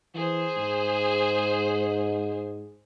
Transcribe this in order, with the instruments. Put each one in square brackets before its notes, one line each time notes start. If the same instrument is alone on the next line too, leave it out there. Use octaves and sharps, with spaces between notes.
[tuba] E3 [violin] G#4 C5
[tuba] G#2